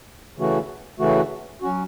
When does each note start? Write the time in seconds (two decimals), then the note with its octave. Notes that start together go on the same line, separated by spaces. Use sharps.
0.37 C#3 E3 A3 F#4
0.99 C#3 E3 A3 F#4
1.61 F#3 C#4 F#4